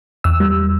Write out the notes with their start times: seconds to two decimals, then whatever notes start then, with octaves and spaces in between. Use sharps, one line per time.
0.24 E2 E6
0.40 G3